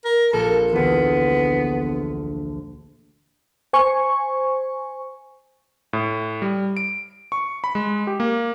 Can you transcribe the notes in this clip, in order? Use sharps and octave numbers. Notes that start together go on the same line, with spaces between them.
A#4
A#1 A4 A#4
D2 E3 B3
C5 G#5 C#6
A2
G3
D7
C#6
B5
G#3
G4
A#3